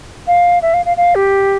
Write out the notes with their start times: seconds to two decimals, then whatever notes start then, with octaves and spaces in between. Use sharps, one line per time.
0.27 F5
0.62 E5
0.74 F5
0.85 F5
0.97 F5
1.15 G4